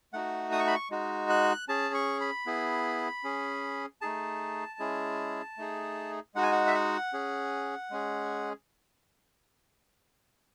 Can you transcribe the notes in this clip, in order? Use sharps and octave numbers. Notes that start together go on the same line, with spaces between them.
A3 D#4 F#4 F#5
D#6
C#6
B5
C#6
G#3 D#4 F#4
F#6
C#4 G#4 A5
C#6
B5
B3 E4 G#4
C#4 G#4
A3 D#4 G#4 A5
G#3 C#4 E4 G#4
A3 D#4 G#4
G#3 D#4 F#4 F#5
G#5
F#5
E5
F#5
C#4 G#4
G#3 C#4 G#4